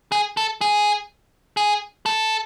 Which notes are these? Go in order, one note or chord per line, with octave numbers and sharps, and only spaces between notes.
G#4
A4
G#4
G#4
A4